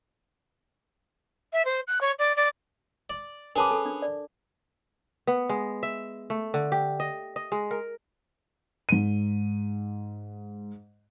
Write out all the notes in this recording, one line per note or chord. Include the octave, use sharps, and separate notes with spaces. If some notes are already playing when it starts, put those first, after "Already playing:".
E5
C5
F#6
C#5
D5
D5
D5
C#4 G#4 A#4 B4 A5 D6
A4
D4
D5
B3
G#3
E5
A3
D3
G4
D#5
D#5
G#3
A#4
G#2 D#7